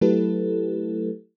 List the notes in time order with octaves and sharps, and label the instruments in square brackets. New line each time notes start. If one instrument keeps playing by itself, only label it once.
[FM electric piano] F#3 A3 E4 G4 A4 B4